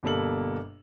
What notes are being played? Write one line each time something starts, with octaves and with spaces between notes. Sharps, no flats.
G1 B2 G3 A#3 A4 F#7